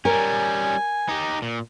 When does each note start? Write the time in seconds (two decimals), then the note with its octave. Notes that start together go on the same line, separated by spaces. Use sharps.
0.05 G3 C#4 A#4 G#5
1.09 D#4 G4
1.42 A#2